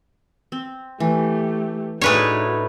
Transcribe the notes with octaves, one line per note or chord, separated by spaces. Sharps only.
C4
E3 A3 G4
A2 D4 D#4 F#4 G#4 B4 C#5